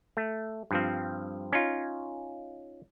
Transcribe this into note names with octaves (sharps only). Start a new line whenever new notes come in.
A3
G2 F3 C4
C#4 D#4 F4